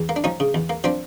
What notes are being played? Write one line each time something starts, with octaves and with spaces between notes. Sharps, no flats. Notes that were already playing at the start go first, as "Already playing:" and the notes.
Already playing: E2
A#3
D4
F3 C#4 D#4
C#3
E2
A#3
F3 C4 D4